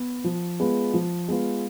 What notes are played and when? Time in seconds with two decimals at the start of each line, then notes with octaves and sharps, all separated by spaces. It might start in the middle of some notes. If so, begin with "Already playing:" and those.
Already playing: B3
0.24 F3
0.60 G#3 B3 F4 B4
0.94 F3
1.28 G#3 B3 F4 B4